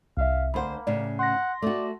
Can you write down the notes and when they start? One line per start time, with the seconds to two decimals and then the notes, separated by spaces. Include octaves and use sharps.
0.17 C2 E5 F5
0.54 D2 A#3 C5 F#5 B5
0.87 A2 C#3 D5
1.19 F#5 C6 A#6
1.62 A3 F#4 D5